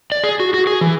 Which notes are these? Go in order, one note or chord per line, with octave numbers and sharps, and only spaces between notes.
D5
G#4
F#4
F#4
G#4
E3